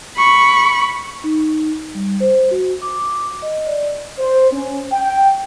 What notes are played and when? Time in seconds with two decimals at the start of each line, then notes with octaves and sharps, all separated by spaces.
0.17 B5 C#6
1.24 D#4
1.94 G3
2.20 C5
2.51 F#4
2.82 D6
3.42 D#5
3.67 D5
4.19 C5
4.51 C#4
4.92 G5